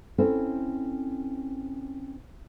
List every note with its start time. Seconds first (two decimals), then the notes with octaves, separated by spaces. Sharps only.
0.18 C4 C#4 E4 A4 C5